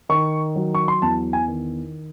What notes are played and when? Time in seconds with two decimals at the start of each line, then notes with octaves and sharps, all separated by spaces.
0.09 D#3 C#6
0.56 F#3
0.75 C#6
0.88 C6
1.02 E2 A5
1.33 G#5
1.48 D#3